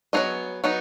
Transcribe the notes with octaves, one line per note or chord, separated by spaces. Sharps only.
F#3 B3 D#4 G#4 D#5
F#3 B3 D#4